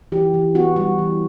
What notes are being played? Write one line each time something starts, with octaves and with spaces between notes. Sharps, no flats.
E3 G4
E3
B3 F#4
G3 F#4
E3